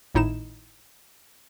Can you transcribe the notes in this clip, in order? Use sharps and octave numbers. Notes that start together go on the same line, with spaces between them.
G#1 A2 D#4 E4 E7